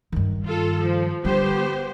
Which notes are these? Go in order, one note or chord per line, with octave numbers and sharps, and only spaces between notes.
G2 D#3
F4 A4
F3
D3 G3 B3 G4 C5